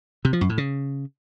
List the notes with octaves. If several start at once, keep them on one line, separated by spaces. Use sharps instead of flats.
C3
F3
F#2
A2
C#3